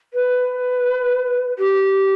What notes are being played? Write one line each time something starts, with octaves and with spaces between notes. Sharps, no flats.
B4
G4